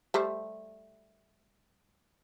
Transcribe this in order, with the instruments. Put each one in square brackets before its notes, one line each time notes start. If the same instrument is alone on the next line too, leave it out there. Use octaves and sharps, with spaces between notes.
[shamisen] G3 A3 C5